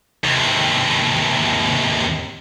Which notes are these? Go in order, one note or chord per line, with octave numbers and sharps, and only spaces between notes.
D#2 C3